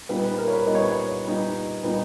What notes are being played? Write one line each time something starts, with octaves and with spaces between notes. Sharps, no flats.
A#2 G3 B3 D#4 B4
B4
A#4
C#5
B4
A#2 G3 B3 D#4 D#5
C#5
B4
C#5
A#2 G3 B3 D#4
A#2 G3 B3 D#4